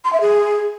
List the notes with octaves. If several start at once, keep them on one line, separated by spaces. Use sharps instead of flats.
C6
E5
G#4